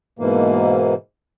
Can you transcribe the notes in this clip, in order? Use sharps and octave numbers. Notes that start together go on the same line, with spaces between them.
G#2 B2 E3 A#3